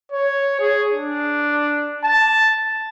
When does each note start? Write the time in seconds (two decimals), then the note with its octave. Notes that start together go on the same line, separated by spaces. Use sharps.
0.12 C#5
0.60 G#4
0.93 D4
2.04 A5